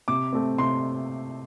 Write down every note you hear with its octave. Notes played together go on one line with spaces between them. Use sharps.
C3 D6
A3 C4
C3 C6